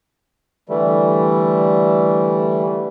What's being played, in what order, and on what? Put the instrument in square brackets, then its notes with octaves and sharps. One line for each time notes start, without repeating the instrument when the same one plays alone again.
[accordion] D3 E3 G3 A3